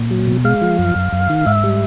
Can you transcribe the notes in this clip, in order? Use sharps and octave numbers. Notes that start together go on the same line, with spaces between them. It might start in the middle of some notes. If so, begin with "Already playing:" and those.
Already playing: A#2
F#3
B2
G#3 F5
F3
F#2
F#2
F#2
D#3
G#2 E5
G3